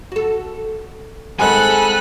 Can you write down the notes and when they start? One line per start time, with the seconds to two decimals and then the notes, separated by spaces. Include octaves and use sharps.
0.12 F#4 A4
1.39 D#3 G#3 C4 A4 F#5 G#5 B5 F#6